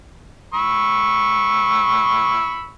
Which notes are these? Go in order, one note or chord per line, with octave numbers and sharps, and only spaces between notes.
B5 C#6 E6